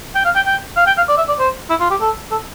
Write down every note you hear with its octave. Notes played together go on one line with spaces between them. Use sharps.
G5
F5
G5
G5
F5
G5
F5
D5
E5
D5
C5
E4
F4
G4
A4
A4